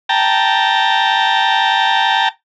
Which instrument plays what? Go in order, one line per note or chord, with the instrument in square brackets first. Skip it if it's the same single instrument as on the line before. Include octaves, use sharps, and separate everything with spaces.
[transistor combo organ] G5 A5 A#5